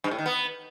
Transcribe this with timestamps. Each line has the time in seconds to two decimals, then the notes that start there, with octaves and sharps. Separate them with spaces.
0.04 G2
0.11 A2
0.19 D#3
0.26 B3